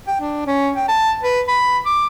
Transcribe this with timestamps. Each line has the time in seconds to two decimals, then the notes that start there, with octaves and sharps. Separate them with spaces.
0.08 G5
0.21 D4
0.47 C#4
0.76 G5
0.88 A5
1.23 B4
1.48 B5
1.86 D6